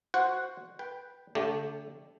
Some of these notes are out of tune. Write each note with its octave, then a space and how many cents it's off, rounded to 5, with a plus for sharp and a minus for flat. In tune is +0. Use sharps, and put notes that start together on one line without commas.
F#4 +0 C5 +0 F#5 +0
B4 -5 G5 +0
D3 -40 A3 +0 G4 +0